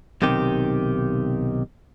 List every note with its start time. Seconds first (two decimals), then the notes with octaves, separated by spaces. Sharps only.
0.22 B1 C3 D#3 G4